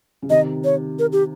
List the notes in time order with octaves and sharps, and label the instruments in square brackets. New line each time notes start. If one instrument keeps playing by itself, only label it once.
[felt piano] C#3
[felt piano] C3 D#3 [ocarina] D#5
[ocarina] C#5
A#4
G4